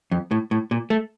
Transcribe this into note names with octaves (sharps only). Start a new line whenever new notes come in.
F2
A2
A2
A#2
A3